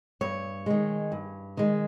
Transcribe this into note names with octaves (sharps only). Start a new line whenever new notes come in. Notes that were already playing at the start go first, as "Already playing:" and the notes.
G2 C#5
D#3 G#3
G2
D#3 G#3